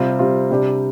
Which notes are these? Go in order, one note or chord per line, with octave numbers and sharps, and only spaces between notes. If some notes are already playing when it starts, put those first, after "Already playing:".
Already playing: C3 G3 C4 F4
C3 G3 C4 F4
C3 G3 D4 G4